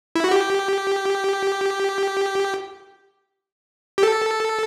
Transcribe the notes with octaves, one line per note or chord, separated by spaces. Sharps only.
E4
F#4
G4
G4
A4